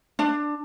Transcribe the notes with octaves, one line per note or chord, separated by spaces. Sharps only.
D4